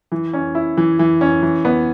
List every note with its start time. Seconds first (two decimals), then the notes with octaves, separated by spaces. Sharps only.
0.12 E3
0.33 C#4
0.55 E4
0.77 E3
0.99 E3
1.21 C#4
1.42 E3
1.65 B3